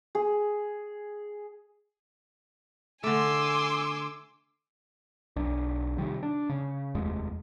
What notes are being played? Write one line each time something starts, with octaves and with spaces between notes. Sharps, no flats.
G#4
D3 A3 G#5 C6 D6 E6
B1 D4
C3 D#3 G3
D4
C#3
F1 D#2 G#3